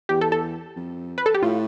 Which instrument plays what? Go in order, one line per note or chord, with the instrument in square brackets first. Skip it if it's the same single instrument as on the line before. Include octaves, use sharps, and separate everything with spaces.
[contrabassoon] E2 [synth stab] G4
[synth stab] A4
A4
[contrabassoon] F2
[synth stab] B4
A4
G4
[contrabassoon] A2 [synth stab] F4